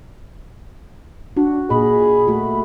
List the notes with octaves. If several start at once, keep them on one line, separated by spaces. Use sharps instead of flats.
D4 F#4
A#2 G#4 D#5 B5
A3 F#4